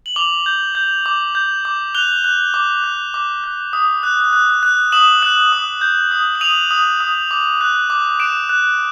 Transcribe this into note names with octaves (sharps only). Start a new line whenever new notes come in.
F#7
D6 F7 G7
G6
G6
D6
G6
D6
F#6 F7 G7
F#6
D6
F#6
D6
F#6
D#6
F#6
F#6
F#6
D#6 E7 F#7
F#6 E7 F#7
D#6
G6
D#6
F#7
D#6 D#7 F7
D#6
D#6
D6
F#6
D6
F#6 D7 E7
F#6